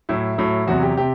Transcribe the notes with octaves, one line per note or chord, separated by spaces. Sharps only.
A2 F#3 E4
A2 F#3
E2 C3 F#3 F#4
G4
C3 G4